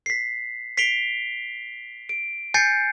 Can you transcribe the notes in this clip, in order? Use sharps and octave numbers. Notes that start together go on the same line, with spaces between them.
B6 C7
B6 C7 D7 F7 G7
D7
G#5 G6 A6 C7 C#7